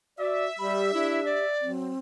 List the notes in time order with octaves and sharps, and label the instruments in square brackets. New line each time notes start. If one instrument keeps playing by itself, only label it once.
[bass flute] F#4 [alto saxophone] D5 [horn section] E5
[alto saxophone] G3 [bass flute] G4 [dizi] B5
[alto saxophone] D4 [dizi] E4
[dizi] D5
[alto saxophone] F#3 [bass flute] C4